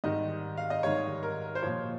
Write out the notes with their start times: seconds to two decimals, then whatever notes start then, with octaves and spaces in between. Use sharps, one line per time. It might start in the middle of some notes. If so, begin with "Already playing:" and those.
0.04 G#2 D#3 G3 D#5
0.57 F5
0.70 D#5
0.83 G#2 D#3 G3 C#5
1.23 A#4
1.55 C5
1.63 A#2 F3 C#5